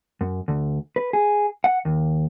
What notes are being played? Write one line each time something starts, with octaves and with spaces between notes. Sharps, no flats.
F#2
D2
B4
G#4
F#5
D#2